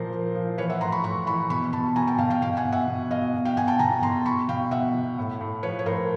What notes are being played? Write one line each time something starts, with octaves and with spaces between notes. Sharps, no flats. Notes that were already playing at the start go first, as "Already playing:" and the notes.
Already playing: A#2 F3 A#4 C5
F3
F3
E3 B4 C#5
E5 F#5
A2 A#5 C6
B5 C#6
A2 B5 C#6
E3 B5 C#6
B2 B5 C#6
B2 A5 B5
B2 G#5 A#5
G5 A5
B2 F5 G5
F5 G5
B2 F5 G5
F#5 G#5
B2
E5 F#5
B2
B2 D#5 F5
B2
F5 G5
B2 F#5 G#5
G5 A5
B2 G#5 A#5
B2 A#5 C6
B2 B5 C#6
B2 F5 G5
B2 E5 F#5
B2
A2
A2
F3 B4 C#5
C#5
A2 A#4 C5